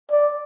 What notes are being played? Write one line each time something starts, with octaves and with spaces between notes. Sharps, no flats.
D5